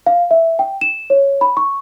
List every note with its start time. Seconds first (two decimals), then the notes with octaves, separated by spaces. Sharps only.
0.06 F5
0.31 E5
0.59 G5
0.81 E7
1.10 C#5
1.41 B5
1.57 C#6